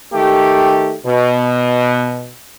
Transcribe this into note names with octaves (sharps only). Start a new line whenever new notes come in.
D#3 A3 G4
B2